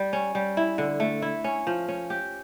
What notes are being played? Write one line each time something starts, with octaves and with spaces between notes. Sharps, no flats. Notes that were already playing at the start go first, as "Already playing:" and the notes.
Already playing: G3
C#4
G3
E4
D3
A3
E4
C#4
F3
C#4
G4